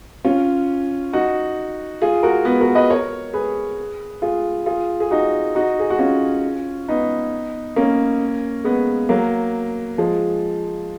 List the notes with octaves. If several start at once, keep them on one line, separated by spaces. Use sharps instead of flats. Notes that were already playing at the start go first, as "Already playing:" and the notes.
C#4 F4
D#4 F#4
F4 G#4
F#4 A#4
G#3 B3
F#4 A#4
B4 D#5
A#4 C#5
G#4 B4
F4 G#4
F4 G#4
G#4
D#4 F#4
D#4 F#4
G#4
F#4
C#4 F4
B3 D#4
A#3 C#4
G#3 B3
F#3 A#3
F3 G#3